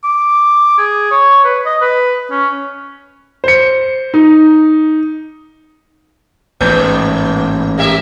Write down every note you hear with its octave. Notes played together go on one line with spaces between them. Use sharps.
D6
G#4
C#5
B4
D#5
B4
C#4
C5 C#7
D#4
A1 G#2 A#3
A#3 G4 E5